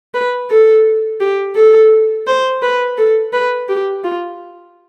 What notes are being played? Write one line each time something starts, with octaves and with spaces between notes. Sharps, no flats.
B4
A4
G4
A4
C5
B4
A4
B4
G4
F4